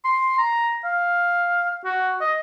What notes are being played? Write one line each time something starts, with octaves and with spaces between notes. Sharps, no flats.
C6
A#5
F5
F#4
D#5